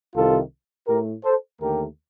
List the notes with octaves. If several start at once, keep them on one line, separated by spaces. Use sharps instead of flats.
C2 C3 D#3 F4 A4
A2 A3 G4 A#4
A4 C5
D#2 D3 A3 G4 A#4